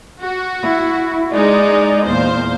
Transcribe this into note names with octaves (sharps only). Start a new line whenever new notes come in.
F#4
E4
G#3 D#4 D5 D#5
E2 A#2 C5 F5